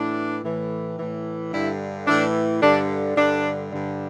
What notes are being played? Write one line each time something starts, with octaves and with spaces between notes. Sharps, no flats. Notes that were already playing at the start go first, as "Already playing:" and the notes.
Already playing: A2 E3 D4
A2 E3
A2 E3
G2 D3 E4
A2 E3 D4
G2 D3 D4
G2 D3 D4
G2 D3